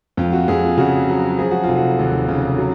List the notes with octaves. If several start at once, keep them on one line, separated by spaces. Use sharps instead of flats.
F2 F4
F#4
F2 G#4
F4
C#3 F#4
F#3
F3 G#4
F#4
F1 F4
F#4
D#2
C#3
F#3